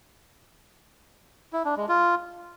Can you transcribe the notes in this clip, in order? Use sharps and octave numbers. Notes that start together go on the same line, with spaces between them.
E4
D4
G#3
F4